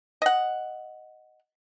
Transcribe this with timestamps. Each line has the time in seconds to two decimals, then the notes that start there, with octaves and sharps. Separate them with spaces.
0.22 D#5 F#5